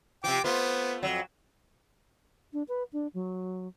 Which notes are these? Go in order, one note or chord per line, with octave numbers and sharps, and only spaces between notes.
C3 F3 G5 D6
A3 B3 F4 C5
F2 F#3
D4
B4
D4
F#3